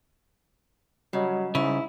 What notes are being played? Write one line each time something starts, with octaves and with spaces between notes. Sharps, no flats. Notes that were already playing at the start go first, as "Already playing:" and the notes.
C#3 F#3 G3 D#5
G#2 C#3 E4